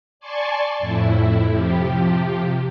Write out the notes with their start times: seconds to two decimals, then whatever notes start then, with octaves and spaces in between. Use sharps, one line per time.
0.20 D5 G#5 A5 C6 C#6
0.79 F2 A2 E4
1.50 C3 F3 G4